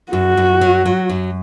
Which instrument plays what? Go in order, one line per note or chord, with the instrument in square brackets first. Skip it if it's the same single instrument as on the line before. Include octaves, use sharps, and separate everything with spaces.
[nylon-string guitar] F#2 [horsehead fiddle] F#4
[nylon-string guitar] F#2
F#3
F#3
F#2